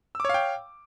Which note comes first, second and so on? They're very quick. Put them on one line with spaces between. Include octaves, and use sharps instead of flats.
E6 D6 C#5 F5 G5